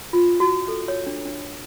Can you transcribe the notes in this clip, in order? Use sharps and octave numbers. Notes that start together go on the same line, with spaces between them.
F4
F#4
A4
C#5
D4
D4